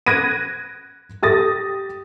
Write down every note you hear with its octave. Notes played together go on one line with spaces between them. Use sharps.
F#6 G#6 A#6 D7 D#7
G4 D#6 A6 A#6